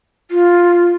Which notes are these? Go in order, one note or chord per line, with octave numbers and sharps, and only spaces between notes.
F4